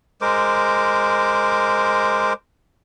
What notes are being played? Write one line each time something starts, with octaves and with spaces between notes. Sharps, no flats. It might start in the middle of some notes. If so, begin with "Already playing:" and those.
G#3 A#4 C5 D6